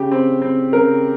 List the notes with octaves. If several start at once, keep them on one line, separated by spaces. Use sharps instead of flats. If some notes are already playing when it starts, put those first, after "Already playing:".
Already playing: C#3 G4
C4
C4
C#3 A#4